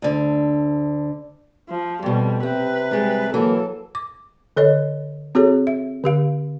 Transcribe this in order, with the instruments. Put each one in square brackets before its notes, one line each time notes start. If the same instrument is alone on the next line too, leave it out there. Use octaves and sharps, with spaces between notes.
[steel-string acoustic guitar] D2 D3
[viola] F3
[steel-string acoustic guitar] F2 B2 [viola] G3
[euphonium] C3 [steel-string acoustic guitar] C4 [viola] B4
[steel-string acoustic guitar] G3 G#3
[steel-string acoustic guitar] E3 A#3 [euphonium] F#3 [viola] A4
[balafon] D6
D3 A4 C#5 D#5
C4 F#4 G#4 A4 C#5
E5
D3 G4 F5